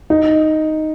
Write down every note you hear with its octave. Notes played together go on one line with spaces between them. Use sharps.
D#4